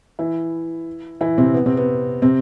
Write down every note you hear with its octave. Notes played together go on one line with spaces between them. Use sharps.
E3 E4
E3 E4
C3 C4
B3
C3 C4
B3
C3 C4